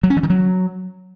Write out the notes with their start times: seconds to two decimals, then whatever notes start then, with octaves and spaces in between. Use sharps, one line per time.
0.03 F#3
0.10 C#4
0.17 E3
0.23 D#3
0.30 F#3